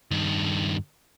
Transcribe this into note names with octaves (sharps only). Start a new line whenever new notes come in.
G2 D#3